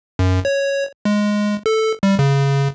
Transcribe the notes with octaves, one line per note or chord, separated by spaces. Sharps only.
F#2
C#5
G#3
A4
G3
C#3